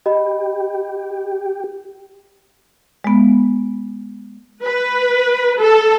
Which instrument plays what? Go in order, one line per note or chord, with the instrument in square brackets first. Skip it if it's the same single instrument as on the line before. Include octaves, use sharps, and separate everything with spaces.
[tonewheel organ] G4 [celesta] D#5 B5
[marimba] G#3 B3
[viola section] B4
A4